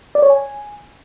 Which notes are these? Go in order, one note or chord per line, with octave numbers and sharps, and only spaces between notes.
D5
C#5
G#5